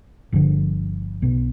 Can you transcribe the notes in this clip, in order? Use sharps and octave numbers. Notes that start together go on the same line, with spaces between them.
G1 F2 D3 F3
B1 B2 B3